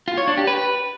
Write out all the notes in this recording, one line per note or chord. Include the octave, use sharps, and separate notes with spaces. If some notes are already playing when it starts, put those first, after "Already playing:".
F4
C#5
D4
G4
B4